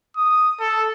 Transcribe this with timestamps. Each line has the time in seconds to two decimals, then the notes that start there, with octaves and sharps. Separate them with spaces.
0.17 D#6
0.60 A4